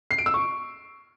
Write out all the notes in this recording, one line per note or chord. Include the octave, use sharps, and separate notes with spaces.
C7
D7
E6
C#6